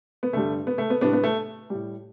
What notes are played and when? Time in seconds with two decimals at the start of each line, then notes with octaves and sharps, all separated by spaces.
0.23 B3
0.33 G2 D3 G3 A3
0.67 B3
0.78 A3
0.90 B3
1.01 A2 G3 B3 D4
1.13 B3
1.23 A3
1.70 A2 G3